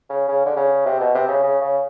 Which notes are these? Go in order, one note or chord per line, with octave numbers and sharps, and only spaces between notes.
C#3
C#3
D3
C#3
C3
B2
C3
C#3
C#3
C#3